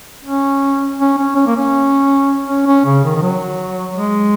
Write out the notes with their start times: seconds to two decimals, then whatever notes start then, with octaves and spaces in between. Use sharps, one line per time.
0.24 C#4
0.99 C#4
1.18 C#4
1.36 C#4
1.47 A#3
1.56 C#4
2.48 C#4
2.67 C#4
2.86 C#3
3.04 D#3
3.16 D#3
3.22 F#3
3.97 G#3